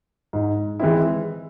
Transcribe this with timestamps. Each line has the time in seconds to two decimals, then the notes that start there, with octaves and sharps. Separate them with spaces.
0.33 G#2
0.80 E3 G#3 C4 E4